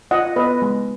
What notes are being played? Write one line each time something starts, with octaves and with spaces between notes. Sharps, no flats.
F4 D#5 F#5
B3 B4 D#5
G#3